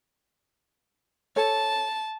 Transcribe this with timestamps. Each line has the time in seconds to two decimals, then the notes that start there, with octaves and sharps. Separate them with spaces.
1.36 A4 C#5 A5